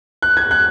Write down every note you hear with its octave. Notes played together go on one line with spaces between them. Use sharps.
F#6
G#6
F#6